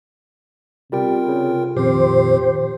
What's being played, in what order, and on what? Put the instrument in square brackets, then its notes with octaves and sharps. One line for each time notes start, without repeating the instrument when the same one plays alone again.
[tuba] C3 [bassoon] G3 [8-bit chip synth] F4 A#4 G5
[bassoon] C#3
[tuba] F2 [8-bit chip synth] A#2 D#3 C4 [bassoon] G4 [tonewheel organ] C5